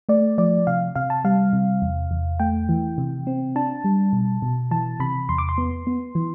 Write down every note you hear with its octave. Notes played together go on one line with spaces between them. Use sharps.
A3 D5
F3 D5
C3 F5
C3 F5
A5
G3 F5
C3
E2
E2
A3 G5
E3
C3
C4
D4 A5
G3
B2
B2
E3 A5
C3 B5
E2 C6
D6
C6
B3
B3
E3